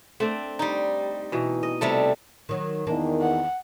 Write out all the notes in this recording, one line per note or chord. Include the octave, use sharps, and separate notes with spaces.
A3 C4 D4
G3 D#4
B2 E3
D#5
C3 G3 A3
D#3 F#3
E2 D#3 A#3 D4
F#5